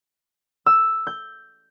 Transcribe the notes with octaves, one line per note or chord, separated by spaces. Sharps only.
E6
G6